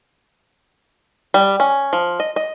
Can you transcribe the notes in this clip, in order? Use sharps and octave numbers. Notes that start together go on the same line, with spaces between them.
G3
C#4
F3
D#5
D#5